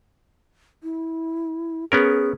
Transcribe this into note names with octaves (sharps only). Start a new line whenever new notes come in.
E4
B3 C#4 G#4 A#4